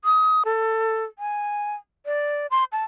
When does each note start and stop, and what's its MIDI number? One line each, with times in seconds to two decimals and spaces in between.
0.04 0.43 87
0.45 1.04 69
1.19 1.74 80
2.06 2.47 74
2.51 2.64 84
2.72 2.84 81